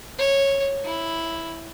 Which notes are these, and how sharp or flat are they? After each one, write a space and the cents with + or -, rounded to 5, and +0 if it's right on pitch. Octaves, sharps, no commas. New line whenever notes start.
C#5 -10
E4 +0